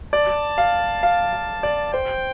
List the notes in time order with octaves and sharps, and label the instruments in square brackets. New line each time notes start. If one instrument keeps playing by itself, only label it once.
[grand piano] D5 [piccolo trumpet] A5
[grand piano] F5
F5
F5
D5
[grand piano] C5 [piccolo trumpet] G5